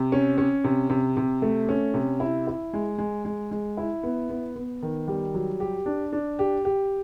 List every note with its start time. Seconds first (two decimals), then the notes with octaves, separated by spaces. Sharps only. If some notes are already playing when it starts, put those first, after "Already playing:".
Already playing: C3
0.12 C#4
0.38 C#4
0.64 C3
0.90 C3
1.17 C3
1.42 A3
1.69 C#4
1.94 C3
2.20 E4
2.47 E4
2.73 G#3
2.98 G#3
3.25 G#3
3.51 G#3
3.77 E4
4.03 B3
4.29 B3
4.56 B3
4.82 D#3
5.08 G3
5.34 F#3
5.60 G4
5.86 D4
6.12 D4
6.39 G4
6.65 G4